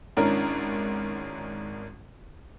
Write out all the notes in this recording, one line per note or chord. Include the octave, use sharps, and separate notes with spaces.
G#1 G#2 C#4 D4 E4 A#4